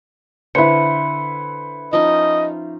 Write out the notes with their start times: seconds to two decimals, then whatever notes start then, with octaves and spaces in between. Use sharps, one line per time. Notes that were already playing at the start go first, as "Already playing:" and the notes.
0.55 D3 E4 B4 C5 B5 C#7
1.93 F3 C#4 D#4 D#5